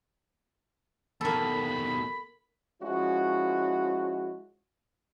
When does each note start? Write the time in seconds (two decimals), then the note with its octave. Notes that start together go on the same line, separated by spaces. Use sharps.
1.21 D#2 B2 A#3 A4 B5
2.82 F3 G#3 C#4 E4 F#4